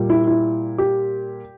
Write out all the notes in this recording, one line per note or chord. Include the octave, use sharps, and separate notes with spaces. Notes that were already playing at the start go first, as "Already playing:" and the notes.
Already playing: A#2 G3
E4
E4
G4